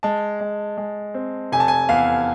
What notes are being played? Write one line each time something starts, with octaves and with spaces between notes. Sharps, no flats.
G#3 A5
G#3
G#3
C4
F1 G#5
A5
G#5
E2 F5